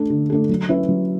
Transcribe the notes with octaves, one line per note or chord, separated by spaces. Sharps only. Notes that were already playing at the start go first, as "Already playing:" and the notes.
Already playing: A3 D4 A4
D3
A3 D4 A4
F#3
C#4 E4 B4 E5
F#3